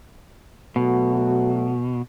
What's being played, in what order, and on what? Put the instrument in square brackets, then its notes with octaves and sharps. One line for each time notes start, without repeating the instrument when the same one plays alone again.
[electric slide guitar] B2 [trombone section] F#3 A3 F#4